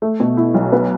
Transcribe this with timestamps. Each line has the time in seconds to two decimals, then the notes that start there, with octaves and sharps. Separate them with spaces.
0.02 A3
0.20 B2
0.37 E4
0.54 B1
0.72 B3